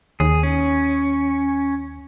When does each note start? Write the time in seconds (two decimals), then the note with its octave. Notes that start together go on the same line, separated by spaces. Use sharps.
0.20 D#2 G#4
0.43 C#4